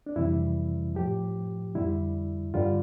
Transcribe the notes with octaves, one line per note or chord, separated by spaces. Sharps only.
D4
F2 C3 E3 G3 E4
A2 F3 G4
F2 D3 G3 E4
G2 D3 G3 F4